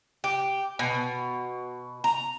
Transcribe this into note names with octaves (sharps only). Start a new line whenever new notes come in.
G4
B2
A#5